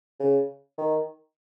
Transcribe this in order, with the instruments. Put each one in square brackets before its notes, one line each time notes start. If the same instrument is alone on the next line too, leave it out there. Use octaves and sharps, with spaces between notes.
[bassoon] C#3
D#3